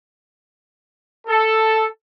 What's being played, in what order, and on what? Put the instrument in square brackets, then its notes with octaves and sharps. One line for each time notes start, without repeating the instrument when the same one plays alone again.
[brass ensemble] A4